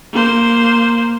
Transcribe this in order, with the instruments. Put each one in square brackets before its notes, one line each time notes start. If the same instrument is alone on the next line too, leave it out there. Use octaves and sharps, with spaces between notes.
[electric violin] A#3 C5